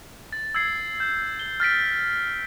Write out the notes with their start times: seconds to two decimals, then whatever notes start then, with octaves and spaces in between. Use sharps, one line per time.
0.33 A6
0.55 E6 G#6 C7
1.00 G6
1.39 G7
1.60 F6 A6 B6 D7